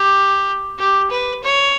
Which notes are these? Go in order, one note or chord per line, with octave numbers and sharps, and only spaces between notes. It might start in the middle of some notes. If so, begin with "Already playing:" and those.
Already playing: G4
G4
B4
C#5